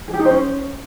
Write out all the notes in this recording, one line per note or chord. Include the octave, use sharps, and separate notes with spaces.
G#4
G4
D#4
C5
C#4